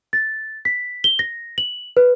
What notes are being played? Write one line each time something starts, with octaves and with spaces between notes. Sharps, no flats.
A6
B6
G7
A#6
F#7
B4